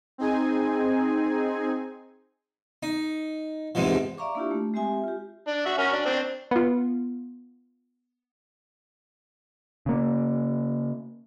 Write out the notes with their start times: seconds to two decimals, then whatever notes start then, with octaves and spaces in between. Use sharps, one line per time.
0.18 C4 D#4 G#4 G#5
2.83 D#4
3.75 E2 G#2 C3 E3 F3
4.18 D5 E5 F5 A#5 C#6 D6
4.35 A#3 D4 E4 F4 G4
4.51 A3
4.74 G#3 C4 G4 E5 G#5 D#6
5.04 F4 G4
5.47 D4
5.66 F#4 E5
5.78 C#4 F#4 A#4
5.93 D4
6.06 C4 D4
6.51 B3 F4
9.86 C#3 A#3